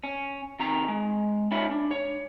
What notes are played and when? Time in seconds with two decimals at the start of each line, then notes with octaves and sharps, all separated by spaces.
0.04 C#4
0.60 C3 D#3 A#5
0.88 G#3
1.51 C#4 D#4 F4 C#5 E5 B5
1.71 D4
1.91 C#5